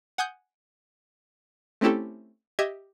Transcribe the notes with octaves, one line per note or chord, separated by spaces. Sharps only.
F#5 G#5 D#6 G6
A3 C4 C#4 E4 G4 A4
G4 D#5 E5 G#6